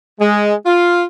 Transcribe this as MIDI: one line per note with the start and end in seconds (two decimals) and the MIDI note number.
0.20 0.53 56
0.66 1.02 65